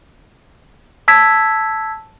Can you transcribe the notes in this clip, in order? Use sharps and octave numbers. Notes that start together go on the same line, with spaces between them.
A5 E6 G#6 B6